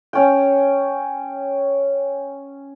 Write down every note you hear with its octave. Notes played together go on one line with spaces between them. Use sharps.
C#4 G5